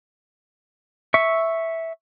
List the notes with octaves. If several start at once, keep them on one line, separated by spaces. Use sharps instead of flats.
E5 C#6